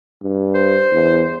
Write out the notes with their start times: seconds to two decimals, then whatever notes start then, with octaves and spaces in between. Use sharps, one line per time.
0.22 G2
0.55 C5
0.92 E2